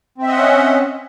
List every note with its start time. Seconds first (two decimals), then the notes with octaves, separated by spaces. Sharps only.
0.18 C4
0.23 E5
0.27 D#5
0.32 F#5
0.37 C#4